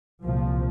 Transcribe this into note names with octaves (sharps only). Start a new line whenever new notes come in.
C2 A#2 F3